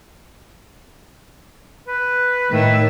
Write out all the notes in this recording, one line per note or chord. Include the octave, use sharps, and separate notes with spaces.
B4
A2 D#3 E5